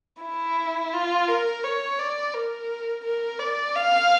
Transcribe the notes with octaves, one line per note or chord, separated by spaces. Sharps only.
E4
F4
A#4
C#5
D5
A#4
A#4
D5
F5